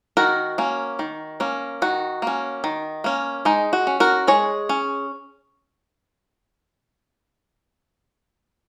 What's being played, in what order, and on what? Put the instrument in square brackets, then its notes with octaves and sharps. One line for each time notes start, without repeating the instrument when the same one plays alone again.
[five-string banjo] D#3 F#4 A#4
A#3 C#4
D#3
A#3 C#4
D#3 F#4
A#3 C#4
D#3
A#3 C#4
G#3 D#4
F#4
C#4
F#4 A#4
G#3 G#4 C#5
C#4